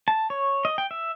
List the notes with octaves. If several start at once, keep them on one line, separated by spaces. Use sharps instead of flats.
A5
C#5
D#5
G5
E5